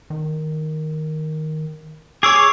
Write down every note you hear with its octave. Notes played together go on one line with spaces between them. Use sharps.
D#3
G#4 C#5 C#6 D6 E6 C7